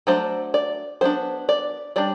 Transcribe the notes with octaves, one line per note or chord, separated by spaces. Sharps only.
F#3 A3 D4 C5
D5
F#3 B3 D4 C5
D5
G3 D4 D5